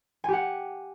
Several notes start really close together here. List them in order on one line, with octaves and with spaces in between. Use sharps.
G#5 G4 F#5